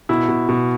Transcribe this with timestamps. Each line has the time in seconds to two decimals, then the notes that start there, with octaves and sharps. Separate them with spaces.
0.09 B2 E4
0.28 B2
0.49 B2